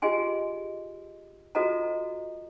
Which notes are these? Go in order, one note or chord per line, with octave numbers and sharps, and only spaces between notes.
F4 G4 G#4 D#5 G#5 C6
F4 F#4 A4 C5 D#5 A#5